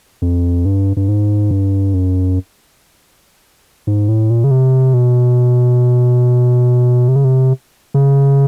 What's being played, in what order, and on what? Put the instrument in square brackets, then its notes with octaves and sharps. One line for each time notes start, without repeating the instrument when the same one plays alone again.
[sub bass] F2
G2
G2
G#2
G2
F#2
G#2
A2
A#2
C#3
C3
B2
C3
C#3
C3
C#3